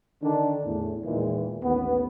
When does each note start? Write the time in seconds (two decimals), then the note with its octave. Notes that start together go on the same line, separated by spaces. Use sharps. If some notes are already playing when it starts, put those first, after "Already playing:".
0.23 D3 D#3 D4
0.65 E2 A2
1.04 E2 A#2 D#3 E3 G#3
1.63 A1 D#2 B3